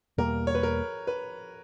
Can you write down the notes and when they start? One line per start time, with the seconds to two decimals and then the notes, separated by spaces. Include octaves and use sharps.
0.18 E2 B2 G3 A#3 A#4
0.47 C#5
0.55 B4
0.63 A#4
1.07 B4